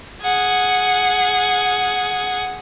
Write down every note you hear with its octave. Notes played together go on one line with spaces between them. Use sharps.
G#4 F#5